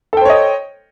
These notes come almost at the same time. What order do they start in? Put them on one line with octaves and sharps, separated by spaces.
A4 G5 C5 C#5 D#5